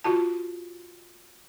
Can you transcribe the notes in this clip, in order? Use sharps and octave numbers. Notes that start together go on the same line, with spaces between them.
F4 F#4 A5